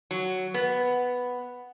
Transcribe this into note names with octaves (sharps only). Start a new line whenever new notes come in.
F#3
B3